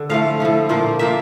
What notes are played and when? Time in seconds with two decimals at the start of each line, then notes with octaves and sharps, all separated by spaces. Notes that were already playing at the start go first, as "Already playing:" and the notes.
Already playing: D3
0.09 A2 F3 A3 F5
0.40 A2 F3 A3
0.69 A#2 F3 A#3
0.99 A#2 F3 A#3 E5